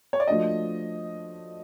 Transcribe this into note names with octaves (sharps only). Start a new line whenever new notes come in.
C#5
D5
F3 A3 D4 F#4 D#5